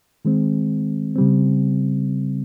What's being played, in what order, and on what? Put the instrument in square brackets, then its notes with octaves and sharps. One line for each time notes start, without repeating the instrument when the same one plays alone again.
[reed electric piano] D#3 G#3 C4
C#3 G3 C4